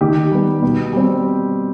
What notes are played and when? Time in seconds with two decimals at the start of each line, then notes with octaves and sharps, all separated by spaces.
0.01 D#3 G4
0.32 G3 B3
0.63 B2
0.93 G3 C4